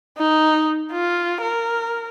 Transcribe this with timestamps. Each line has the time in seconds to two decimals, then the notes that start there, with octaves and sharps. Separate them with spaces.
0.18 D#4
0.92 F4
1.42 A#4